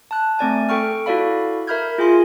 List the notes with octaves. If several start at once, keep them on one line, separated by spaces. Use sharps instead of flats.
A5 F#6
A3 C4 D5 G#5
A4 G5 C#6 F6
E4 F#4 A4 D5 F5 B5
A#4 E5 B5 F6 G6 G#6
F4 G#4 G#5 C6